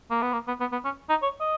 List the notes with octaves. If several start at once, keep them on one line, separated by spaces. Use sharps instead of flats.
A#3
B3
A#3
B3
B3
B3
C#4
D#4
C#5
D#5